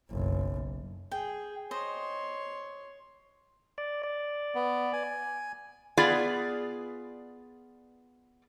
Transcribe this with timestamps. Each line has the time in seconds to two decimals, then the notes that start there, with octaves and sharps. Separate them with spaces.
0.10 F#1 B1
1.12 G#4 G5
1.71 C5 C#5 D#5 C6
3.78 D5
4.04 D5
4.55 B3
4.93 G#5
5.97 B3 F4 G#4 D5